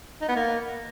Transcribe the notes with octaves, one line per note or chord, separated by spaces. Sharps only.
D#4
B3
A#3